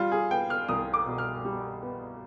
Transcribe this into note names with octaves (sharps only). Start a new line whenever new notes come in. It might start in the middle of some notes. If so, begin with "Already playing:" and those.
Already playing: G3 F4
G#4
B3 G5
F6
C2 D#6
D6
B2
F6
G3
B3